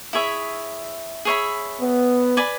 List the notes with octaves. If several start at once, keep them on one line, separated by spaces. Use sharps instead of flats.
E4 G#4 C#5 E5
G#4 C#5 E5 B5
B3
B4 D5 G#5 B5